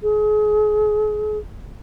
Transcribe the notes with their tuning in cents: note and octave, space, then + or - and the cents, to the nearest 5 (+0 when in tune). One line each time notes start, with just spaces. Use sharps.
G#4 +35